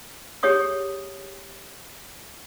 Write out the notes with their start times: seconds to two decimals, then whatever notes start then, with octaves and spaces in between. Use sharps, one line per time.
0.43 G4 G#4 C#5 C#6 D#6